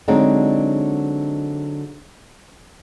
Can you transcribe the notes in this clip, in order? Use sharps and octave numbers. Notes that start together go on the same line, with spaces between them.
D3 F#3 G#3 C4 D4 D#4